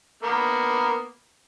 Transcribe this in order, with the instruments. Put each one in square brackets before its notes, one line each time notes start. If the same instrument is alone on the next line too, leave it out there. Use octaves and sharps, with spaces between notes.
[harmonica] A#3 B3 A#4